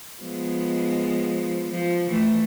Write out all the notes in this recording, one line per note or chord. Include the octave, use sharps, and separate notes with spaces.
F3 G#3 B3
F3
E3 A3